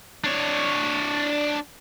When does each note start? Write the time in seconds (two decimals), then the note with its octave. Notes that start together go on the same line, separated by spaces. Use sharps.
0.24 D4 C#5